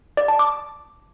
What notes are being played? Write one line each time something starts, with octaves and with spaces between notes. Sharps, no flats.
D5
A5
D6